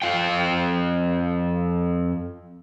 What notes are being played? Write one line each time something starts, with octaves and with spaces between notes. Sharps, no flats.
F2 G#2 F4 F5 G5